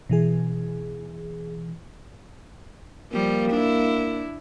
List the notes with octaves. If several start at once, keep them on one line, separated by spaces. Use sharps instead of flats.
B2 E3 G#4
F3 G3 A#3
D4 E4